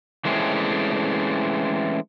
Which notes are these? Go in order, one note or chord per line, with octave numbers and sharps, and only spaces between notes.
E3 G#3 A3 C4 C#4